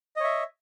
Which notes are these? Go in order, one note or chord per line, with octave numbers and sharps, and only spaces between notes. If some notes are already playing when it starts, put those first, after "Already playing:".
C#5 D#5 E5